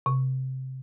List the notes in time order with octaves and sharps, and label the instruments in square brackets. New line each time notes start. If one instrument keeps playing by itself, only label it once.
[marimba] C3